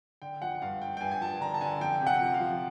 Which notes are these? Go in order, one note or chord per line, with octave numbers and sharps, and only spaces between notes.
D3 G5
F3 F#5
G2 F5
G2 G5
G5
G2 G#5
G#5
F3 A5
D3 A#5
A5
D3 G#5
F2 G5
C3
F#5
F3
F5
F3